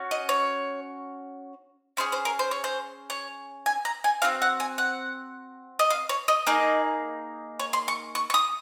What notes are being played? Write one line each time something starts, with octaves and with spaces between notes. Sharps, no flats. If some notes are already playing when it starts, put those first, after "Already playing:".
Already playing: C#4 F#4
D#5
C#5
C#4 F4 G#4 C5
C5
A#4
C5
C#5
C5
C#5
G#5
A#5
G#5
C4 D#4 F#4 F5
F#5
G#5
F#5
D#5
F5
C#5
D#5
A#3 D#4 G#4 D#5
C#5
C6
C#6
C#6
C#6
D#6